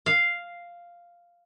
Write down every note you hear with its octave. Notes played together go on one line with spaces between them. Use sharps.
F5